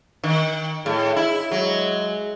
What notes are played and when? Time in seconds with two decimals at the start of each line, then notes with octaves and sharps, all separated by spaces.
0.23 D#3
0.86 A2 G#4
1.16 E4
1.51 F#3 G#3